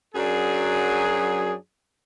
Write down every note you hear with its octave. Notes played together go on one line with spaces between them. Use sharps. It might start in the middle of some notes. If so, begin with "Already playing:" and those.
F#2 F#3 D4 G#4